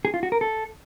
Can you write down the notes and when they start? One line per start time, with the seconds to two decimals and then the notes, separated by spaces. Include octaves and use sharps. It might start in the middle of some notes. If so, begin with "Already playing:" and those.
0.05 G#4
0.14 F4
0.23 F#4
0.32 A#4
0.41 A4